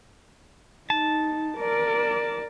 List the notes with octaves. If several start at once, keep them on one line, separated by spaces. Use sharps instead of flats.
D#4 A5
A#4 D5